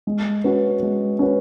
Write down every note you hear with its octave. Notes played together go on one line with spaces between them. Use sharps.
G#3
C#4 F#4 B4
G#3
C#4 F#4 B4